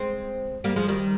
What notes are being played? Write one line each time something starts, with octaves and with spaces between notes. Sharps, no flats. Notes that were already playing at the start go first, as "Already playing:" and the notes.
Already playing: G#3 C4
G3 A#3
F3 G#3
D#3 G3